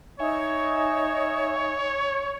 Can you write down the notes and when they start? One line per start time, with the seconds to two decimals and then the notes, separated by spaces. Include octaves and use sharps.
0.20 D#4 C#5 E5 G#5